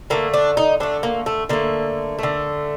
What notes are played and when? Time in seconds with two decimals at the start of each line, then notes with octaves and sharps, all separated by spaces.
0.10 D3 A3 A#3
0.34 D4
0.57 D#4
0.80 D3 A3 D4
1.03 A#3
1.26 A3
1.49 D3 A3 A#3
2.19 D3 A3